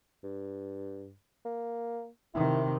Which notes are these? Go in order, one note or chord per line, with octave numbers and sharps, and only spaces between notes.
G2
A#3
C3 D#3 E4